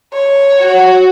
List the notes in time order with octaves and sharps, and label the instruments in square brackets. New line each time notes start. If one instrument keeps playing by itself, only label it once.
[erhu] C#5
[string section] F#4